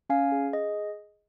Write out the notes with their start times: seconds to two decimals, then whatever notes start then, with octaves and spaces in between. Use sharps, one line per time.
0.10 C#4 F5 G#5
0.32 G#4
0.53 G#4 D#5